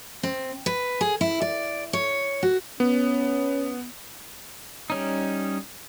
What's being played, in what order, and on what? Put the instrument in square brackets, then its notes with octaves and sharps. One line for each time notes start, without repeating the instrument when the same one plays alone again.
[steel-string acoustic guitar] C4
B4
G#4
E4
D5
C#5
F#4
[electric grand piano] B3 [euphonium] C#4
[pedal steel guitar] G3 C#4 D#4